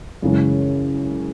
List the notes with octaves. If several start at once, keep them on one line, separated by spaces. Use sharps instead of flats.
F#2 C#3 E3 G#3 C#4